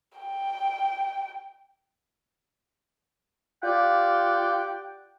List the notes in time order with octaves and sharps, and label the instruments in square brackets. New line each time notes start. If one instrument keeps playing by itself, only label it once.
[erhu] G5
[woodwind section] F4 G4 D5 F#5 G5